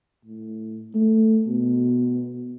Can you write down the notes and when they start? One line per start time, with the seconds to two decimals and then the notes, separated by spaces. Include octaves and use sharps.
0.25 A2
0.94 A3
1.47 B2